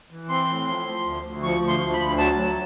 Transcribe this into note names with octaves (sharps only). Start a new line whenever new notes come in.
E3
C4 C6
A2
F3
F3
D2
D2
F3 C#6
D2
C6
F3
B5
D2
F#3 A5
F#3